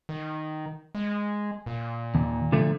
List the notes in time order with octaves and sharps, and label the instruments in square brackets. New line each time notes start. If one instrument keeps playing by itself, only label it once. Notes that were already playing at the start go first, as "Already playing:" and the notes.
[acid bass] D#3
G#3
A#2
[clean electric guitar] D#2
D3 F3 A3